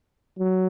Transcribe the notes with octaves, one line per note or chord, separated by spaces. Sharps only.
F#3